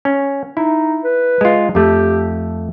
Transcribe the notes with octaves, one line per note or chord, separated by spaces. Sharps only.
C#4
D#4 E4
B4
G#3 F4
F2 A3 G4